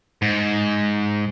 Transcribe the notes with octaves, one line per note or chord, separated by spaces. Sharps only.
G#2